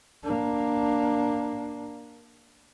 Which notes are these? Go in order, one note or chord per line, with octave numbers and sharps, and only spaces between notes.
A#3 D4